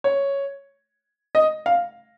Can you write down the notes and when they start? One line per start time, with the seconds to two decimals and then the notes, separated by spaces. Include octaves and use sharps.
0.04 C#5
1.35 D#5
1.66 F5